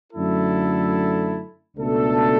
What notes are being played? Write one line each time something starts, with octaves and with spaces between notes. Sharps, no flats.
F#2 D3 A3 E4 A4
C#2 B2 A3 D4 A4